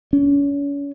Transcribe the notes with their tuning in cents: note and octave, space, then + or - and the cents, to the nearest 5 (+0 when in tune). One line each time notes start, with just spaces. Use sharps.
C#4 +35